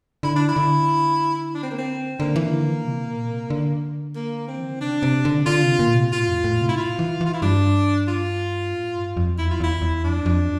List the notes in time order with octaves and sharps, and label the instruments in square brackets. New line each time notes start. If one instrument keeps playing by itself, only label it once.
[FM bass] D3 [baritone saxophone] E4
[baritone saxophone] D4
E4
[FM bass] D3
[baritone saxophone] D4
C4
A#3
C4
[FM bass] D3 [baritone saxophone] A#3
[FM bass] E3
D3
E3
C3
A#2
C3
D3
[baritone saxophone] A#3
C4
[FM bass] E3
D3
[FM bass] C3 [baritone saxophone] D4
[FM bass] C3
D3
[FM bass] D3 [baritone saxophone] F4
[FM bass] C3
A#2
C3
[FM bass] A2 [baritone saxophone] F4
[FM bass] F2
A2
C3
[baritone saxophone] E4
F4
[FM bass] E3
E3
[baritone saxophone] F4
E4
[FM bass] G2 [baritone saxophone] D4
[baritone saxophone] F4
[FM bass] A2
G2
F2
[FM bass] E2 [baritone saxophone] E4
[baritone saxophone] F4
[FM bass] E2 [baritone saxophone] E4
[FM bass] E2
[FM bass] F2 [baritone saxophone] D4
[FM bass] F2